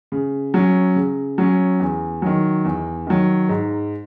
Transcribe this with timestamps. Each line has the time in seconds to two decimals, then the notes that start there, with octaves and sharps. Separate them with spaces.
0.12 C#3
0.54 F#3 C#4
0.96 C#3
1.38 F#3 C#4
1.80 E2
2.22 D#3 F#3
2.65 E2
3.07 D#3 F#3
3.49 G#2